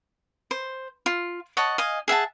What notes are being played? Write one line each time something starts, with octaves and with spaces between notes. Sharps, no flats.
C5
F4
C#5 D#5 F#5 A5
D#5 F5 G#5
G#4 E5 F#5 A5